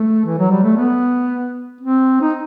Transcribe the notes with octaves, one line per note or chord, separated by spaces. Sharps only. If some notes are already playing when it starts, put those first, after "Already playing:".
Already playing: A3
E3
F#3
G3
A3
B3
C4
D#4